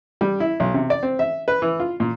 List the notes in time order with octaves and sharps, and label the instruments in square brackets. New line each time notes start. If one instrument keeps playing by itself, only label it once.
[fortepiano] G3
E4
B1
C3
D5
C4
E5
B4
E3
F4
A#2